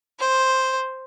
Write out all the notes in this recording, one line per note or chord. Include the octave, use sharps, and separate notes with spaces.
C5